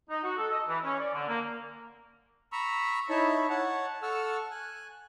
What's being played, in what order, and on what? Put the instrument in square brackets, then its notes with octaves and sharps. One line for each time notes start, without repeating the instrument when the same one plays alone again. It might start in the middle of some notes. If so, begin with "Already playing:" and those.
[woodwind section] D#4
F#4
A4
D#5
E3
C#4
D5
D3
A#3
[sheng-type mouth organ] A#5 B5 C#6 E6
D#4 E4 C#5 E5 A5 B5
C#5 F#5 A5
A4 F#5 A5 C#6 E6 F6
G#5 F#6